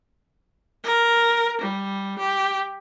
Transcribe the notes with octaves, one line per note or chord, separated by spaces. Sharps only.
A#4
G3
G4